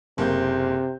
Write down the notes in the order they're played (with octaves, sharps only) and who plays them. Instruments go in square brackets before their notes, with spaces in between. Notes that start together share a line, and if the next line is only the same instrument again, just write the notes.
[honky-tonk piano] F#1 A#3 G6 [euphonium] C3